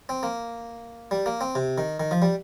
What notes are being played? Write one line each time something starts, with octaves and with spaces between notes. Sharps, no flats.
C4
A#3
G3
A#3
C4
C3
D#3
D#3
F3
G3